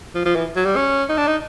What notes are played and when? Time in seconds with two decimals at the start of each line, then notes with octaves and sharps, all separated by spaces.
0.15 F3
0.25 F3
0.35 E3
0.56 F#3
0.66 G3
0.76 C#4
1.09 D#4
1.17 D4
1.27 D#4